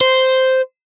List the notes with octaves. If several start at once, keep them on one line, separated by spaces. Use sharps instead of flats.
C5